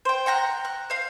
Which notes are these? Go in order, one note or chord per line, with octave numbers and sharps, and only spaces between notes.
C5 G5
F#5 G5 A#5 F#6
F#6
C5 F5